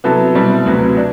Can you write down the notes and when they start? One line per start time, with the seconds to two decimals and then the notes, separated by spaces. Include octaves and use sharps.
0.04 C3 F#3 B3 E4 A4
0.35 B2 G3 C4 E4
0.66 D2 C3 F#3 B4
0.97 D4